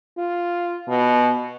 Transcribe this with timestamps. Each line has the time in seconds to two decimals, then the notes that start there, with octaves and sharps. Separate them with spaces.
0.18 F4
0.88 B2